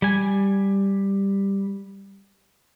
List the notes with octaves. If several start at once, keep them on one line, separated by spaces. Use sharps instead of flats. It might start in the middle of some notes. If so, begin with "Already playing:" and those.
G3 G#5